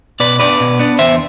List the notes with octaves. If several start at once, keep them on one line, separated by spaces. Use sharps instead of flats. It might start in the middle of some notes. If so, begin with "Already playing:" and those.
B2 B4 D5
B3 D4 B4 D5
B2
B3 D4
E2 C5 E5